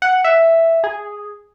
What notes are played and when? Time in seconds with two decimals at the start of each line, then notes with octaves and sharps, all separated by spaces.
0.02 F#5
0.24 E5
0.84 G#4